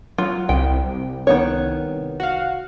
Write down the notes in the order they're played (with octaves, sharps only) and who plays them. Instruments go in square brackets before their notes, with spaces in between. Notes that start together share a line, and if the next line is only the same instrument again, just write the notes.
[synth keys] F#3 [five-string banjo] F4
[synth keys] C2 [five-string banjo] G5
[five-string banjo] D#3 B3 C#5
[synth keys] F#4 F5